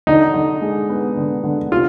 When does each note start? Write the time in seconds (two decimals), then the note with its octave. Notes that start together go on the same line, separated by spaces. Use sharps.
0.07 D3 D#4
0.34 D3
0.61 G#3
0.89 B3
1.17 D3
1.44 D3
1.72 C3 F4